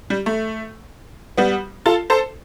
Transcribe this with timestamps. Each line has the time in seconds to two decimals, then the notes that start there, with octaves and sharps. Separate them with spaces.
0.10 G3
0.26 A3
1.38 G3 B3
1.86 F4 A4
2.10 A4 C5